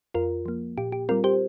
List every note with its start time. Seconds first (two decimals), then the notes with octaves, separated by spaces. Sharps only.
0.14 F2 F4 A#4
0.46 F3 A#3
0.78 A#2 G4
0.92 G4
1.09 G3 C4 F4 A#4
1.24 G4 C5